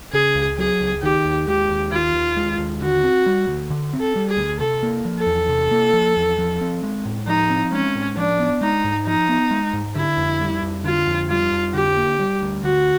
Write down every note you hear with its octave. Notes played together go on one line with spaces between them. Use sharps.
C#3 G#4
C#2
F#3 G#4
C#2
D#3 G4
D#2
G#3 G4
D#2
D#3 F4
D#2
G#3
D#2
D3 F#4
C4
G3
D2
D3
C4
A4
G3
G#4
D2
C3 A4
A#3
F3
A4
E2
C3
A#3
F3
E2
F3
C4
G#3
A2
F3 D#4
C4
G#3 C#4
A2
F3 D4
B3
G#3 D#4
G#2
F3 D#4
B3
G#3
G#2
D3 E4
F2
G3
F2
D3 F4
F2
G3 F4
F2
D3 G4
A#3
G3
D2
D3 F#4